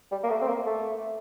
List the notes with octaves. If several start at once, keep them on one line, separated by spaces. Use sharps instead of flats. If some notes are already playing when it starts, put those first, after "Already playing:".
G3
A#3
A3
C4
A#3
A3